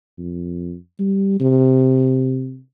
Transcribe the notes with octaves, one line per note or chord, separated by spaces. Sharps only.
F2
G3
C3